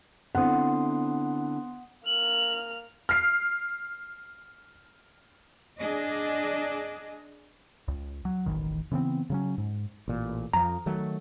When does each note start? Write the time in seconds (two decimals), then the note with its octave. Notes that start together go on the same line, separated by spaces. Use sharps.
0.35 D3 B3 C4 E4 F#5 C6 D#6
2.06 A#3 F6 F#7
3.09 F6 C7
5.80 D4 G#4 D#5
7.88 C#2
8.25 F#3
8.46 E1 A1 F2 D#3
8.91 C#3 E3 B3 C4
9.30 C#3 F#3 C#4
9.58 G#2
10.08 A1 A#2
10.53 F2 F3 A#5
10.86 D#3 F#3 A3